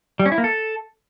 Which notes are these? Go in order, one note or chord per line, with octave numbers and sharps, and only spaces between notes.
G3
C#4
E4
A#3
A4